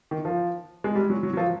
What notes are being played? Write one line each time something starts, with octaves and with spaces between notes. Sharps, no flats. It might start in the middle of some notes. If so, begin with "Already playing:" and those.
D#3
F3
G#3
G3
F#3
F#3
F#3
F3